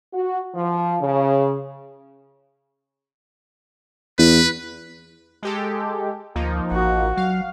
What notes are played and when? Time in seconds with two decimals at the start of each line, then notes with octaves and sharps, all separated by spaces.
0.14 F#4
0.55 F3
1.02 C#3
4.18 E2 B4
5.43 G#3 G4 A4
6.36 D2 F3 A#3 D#4
6.71 A1 F#4
7.17 F#3 F5